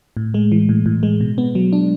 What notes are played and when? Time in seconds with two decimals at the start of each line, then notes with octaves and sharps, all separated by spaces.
0.17 A2
0.34 G#3
0.52 E3
0.69 A2
0.86 A2
1.03 G#3
1.21 B2
1.38 B3
1.55 F#3
1.73 D4